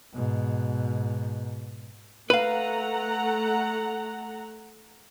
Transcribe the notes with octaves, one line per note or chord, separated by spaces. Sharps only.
G#2 B2
A3 B4 F5 F#5 A#5